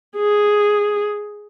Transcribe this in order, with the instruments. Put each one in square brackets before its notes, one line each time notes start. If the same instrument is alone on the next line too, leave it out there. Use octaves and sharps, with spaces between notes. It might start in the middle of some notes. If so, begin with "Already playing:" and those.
[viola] G#4